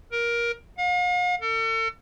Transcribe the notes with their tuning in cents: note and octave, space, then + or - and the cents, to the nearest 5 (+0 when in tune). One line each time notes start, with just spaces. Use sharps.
A#4 +15
F5 +45
A4 +40